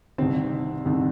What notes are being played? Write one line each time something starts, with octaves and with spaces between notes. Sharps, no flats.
C2 C3 D#3 C4
C2 C3 D#3